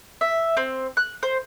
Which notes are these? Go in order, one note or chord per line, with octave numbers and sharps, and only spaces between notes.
E5
C4
F#6
C5